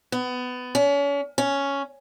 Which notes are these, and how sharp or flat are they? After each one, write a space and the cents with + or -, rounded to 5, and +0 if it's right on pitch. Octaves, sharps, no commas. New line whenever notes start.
B3 +20
C#4 +35
C#4 +5